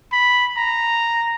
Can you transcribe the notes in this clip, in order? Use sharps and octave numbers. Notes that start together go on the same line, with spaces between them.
B5
A#5